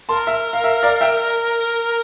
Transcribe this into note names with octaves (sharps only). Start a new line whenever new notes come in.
A#4 A5 C6
E5
F5
E5
D5 F5
E5 G5